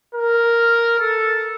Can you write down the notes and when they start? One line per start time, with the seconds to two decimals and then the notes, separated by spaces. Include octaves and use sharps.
0.15 A#4
1.00 A4